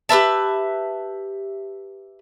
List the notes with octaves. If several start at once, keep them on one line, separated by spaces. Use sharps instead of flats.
G4 B4 E5 A5